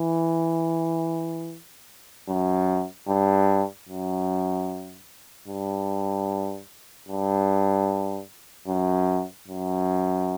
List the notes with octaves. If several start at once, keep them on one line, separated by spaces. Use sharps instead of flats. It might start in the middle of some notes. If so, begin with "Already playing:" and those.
Already playing: E3
F#2
G2
F#2
G2
G2
F#2
F#2